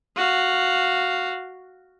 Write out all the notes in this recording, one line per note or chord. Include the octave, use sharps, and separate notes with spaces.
F#4 F5